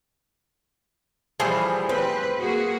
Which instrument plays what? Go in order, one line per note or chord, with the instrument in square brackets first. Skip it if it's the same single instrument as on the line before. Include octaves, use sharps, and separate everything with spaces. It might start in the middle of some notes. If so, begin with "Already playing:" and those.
[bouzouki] E3 F3 G3 [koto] A3 G#4 C5
[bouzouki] C4 [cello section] B4
[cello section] A#3 F#4 G#4